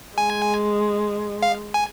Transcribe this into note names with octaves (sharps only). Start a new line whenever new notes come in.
G#3 G#5
F5
G#5